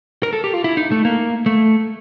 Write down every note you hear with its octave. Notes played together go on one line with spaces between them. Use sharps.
A#4
A4
G4
F4
E4
D#4
A3
A#3
A3